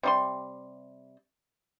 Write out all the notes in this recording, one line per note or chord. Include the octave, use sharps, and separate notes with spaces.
C3 G3 C6